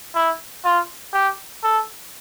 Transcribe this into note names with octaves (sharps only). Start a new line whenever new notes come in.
E4
F4
G4
A4